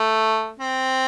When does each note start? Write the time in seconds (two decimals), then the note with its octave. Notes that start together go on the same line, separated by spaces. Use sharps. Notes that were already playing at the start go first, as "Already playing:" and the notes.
Already playing: A3
0.59 C4